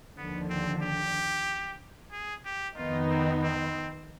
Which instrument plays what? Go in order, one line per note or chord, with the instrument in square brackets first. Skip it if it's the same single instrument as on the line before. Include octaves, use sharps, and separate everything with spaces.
[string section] D#2 D3 F3 [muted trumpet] B3
[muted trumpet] C4
G4
G#4
G4
[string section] F2 D#3 B3 D#4 [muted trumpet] F4
[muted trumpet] C4
C4